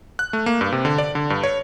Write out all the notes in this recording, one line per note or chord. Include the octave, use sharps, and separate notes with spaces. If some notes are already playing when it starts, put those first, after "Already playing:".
F#6
A3
A#3
G2
C3
D3
D5
D3
G2
C#5